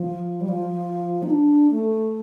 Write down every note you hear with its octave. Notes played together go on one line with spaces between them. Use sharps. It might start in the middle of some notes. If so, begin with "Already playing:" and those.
Already playing: F3
G3
F3
D#4
D4
A3